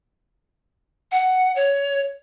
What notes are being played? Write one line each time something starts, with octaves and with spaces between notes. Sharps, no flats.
F#5
C#5